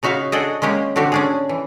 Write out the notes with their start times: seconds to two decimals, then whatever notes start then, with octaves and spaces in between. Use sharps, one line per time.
0.03 C#3 D#4 F#4 E5 F5
0.32 D4 F#4 G#4 A4 D5 D#5
0.62 G#3 A#3 C#4 G4
0.96 D3 C4 F#4 G4
1.12 C#4 D4 G#4
1.49 E3